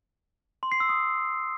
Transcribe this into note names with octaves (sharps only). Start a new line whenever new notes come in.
C6
C7
E6
D#6